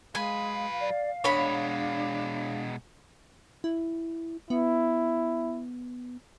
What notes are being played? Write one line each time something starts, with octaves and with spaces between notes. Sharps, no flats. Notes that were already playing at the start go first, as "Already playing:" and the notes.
F#3 G#3 B4 F5 G#5
D5
B2 G#3 D4 C#5 B5
E4
B3 E4